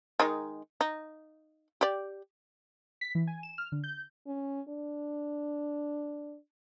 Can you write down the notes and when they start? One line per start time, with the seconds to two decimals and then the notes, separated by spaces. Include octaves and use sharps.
0.20 D#3 G#3 D#4
0.81 D#4
1.81 G4 D5
3.01 B6
3.15 E3
3.27 G#5
3.43 E7
3.58 F6
3.72 D3
3.84 G6
4.27 C#4
4.68 D4